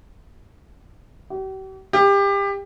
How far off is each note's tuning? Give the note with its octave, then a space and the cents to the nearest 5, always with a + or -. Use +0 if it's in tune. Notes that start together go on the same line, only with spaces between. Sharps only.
G4 -45
G4 +25